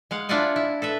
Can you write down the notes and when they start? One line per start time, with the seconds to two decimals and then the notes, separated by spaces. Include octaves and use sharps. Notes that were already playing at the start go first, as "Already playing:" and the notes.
0.11 G#3 F5 F#5
0.29 D4 E4 F4 D5 F#5 G#5
0.56 E4
0.82 A4 B4 E5